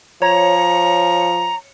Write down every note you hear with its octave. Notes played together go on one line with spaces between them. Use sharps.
F3 C#5 A#5